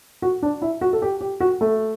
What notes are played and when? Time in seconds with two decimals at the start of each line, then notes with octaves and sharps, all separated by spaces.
0.22 F#4
0.43 D4
0.62 E4
0.81 F#4
0.93 A4
1.02 G4
1.21 G4
1.40 F#4
1.61 A3